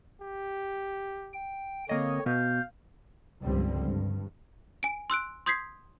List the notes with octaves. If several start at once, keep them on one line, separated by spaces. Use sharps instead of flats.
G4
G5
D3 A#3 C4 C#5 D#5
B2 F5 G6
C#2 G2 D3 F3 G3 C4
G2
G#5 D7
C6 E6 F#6 D7
C6 D#6 G6 G#6 B6 C7